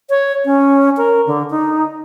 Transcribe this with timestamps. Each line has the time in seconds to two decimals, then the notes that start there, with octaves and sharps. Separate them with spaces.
0.10 C#5
0.45 C#4
0.97 A#4
1.27 D3
1.50 D#4